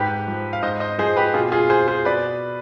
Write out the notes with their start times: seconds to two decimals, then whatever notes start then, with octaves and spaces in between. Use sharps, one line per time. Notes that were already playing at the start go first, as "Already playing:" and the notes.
Already playing: G#2 G4 B4
0.27 F3
0.53 F5
0.62 G#2 C5 D#5
0.80 C5 D#5
0.98 F3 G#4 C5
1.17 G4 B4
1.34 B2 F4 G#4
1.52 F4 G#4
1.70 G#4 C5
1.88 G#4 C5
2.05 B2 B4 D5